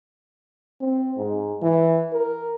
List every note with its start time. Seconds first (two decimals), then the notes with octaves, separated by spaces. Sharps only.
0.80 C4
1.17 G#2
1.62 E3
2.13 A#4